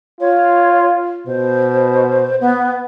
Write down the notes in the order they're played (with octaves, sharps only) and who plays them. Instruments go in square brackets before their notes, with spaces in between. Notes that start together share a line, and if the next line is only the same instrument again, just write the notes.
[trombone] F4 [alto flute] C#5
[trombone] B2 [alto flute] C5
[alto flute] B3